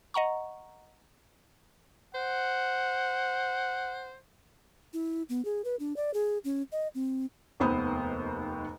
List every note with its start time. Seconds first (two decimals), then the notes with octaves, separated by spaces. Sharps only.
0.14 D#5 F#5 A#5 C#6
2.15 C5 F#5
4.93 E4
5.29 B3
5.45 G#4
5.65 B4
5.79 D4
5.96 D5
6.14 G#4
6.44 C#4
6.72 D#5
6.95 C4
7.60 F1 D#2 B3 C5 B5 D#6